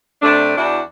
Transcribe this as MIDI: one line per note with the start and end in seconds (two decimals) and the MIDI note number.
0.22 0.55 48
0.22 0.55 57
0.22 0.55 62
0.56 0.80 40
0.56 0.80 62
0.56 0.80 64
0.56 0.80 66